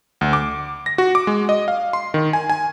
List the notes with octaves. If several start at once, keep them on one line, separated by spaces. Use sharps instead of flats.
D2
D6
A#6
F#4
D6
G#3
D#5
F5
C6
D#3
G#5
G#5